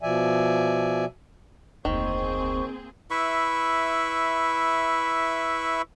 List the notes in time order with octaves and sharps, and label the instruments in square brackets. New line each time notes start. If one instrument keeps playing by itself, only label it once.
[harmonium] B2 F3 D5 E5 G#5
[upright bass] F1 D2 [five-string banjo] D#3 [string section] A#3 C4 G#4 [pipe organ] C5 C#6
[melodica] E4 B4 E5 C#6